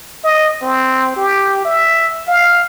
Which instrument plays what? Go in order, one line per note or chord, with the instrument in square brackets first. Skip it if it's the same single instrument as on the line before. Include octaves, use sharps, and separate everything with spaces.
[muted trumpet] D#5
C4
G4
E5
F5